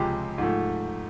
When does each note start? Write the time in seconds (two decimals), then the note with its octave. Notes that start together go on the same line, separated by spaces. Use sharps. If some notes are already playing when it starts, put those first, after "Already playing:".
Already playing: C#2 C3 F3 G#3 G4
0.38 G#2 F3 A3